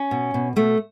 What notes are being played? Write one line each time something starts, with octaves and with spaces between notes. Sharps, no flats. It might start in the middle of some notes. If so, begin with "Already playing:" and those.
Already playing: C#4
B2
B2
B2 A3